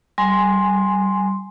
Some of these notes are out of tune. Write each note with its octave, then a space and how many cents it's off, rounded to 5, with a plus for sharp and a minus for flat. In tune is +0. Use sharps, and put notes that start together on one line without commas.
G3 -25 G#5 +0 C6 +0